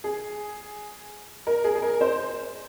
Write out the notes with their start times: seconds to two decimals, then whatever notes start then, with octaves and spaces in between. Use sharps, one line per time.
0.04 G#4
1.47 A#4
1.64 G#4
1.75 G#4
1.82 A#4
2.01 C5